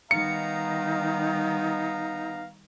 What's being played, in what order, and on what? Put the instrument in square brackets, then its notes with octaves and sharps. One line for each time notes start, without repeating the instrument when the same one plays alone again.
[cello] D#3 G3 [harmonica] B3 F5 A#5 [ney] D#4 [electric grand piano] C#7